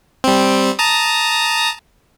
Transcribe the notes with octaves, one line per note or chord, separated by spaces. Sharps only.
G3 C4
A5 A#5 D#6